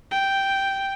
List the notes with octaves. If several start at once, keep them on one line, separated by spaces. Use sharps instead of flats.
G5